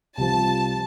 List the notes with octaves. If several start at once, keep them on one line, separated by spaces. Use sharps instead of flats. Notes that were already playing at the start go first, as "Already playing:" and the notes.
C2 C3 F3 A5